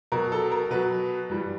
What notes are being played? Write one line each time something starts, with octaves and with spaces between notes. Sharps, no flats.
B2 F#3 A#4
A4
A#4
B2 F#3 B4
G2 E3 G3